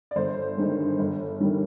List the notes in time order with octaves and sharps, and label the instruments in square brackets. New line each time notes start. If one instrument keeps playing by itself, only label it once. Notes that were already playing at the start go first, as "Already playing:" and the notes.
[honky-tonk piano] D5
G1 C5
G2 D#3 G#3
G1
G2 D#3 G3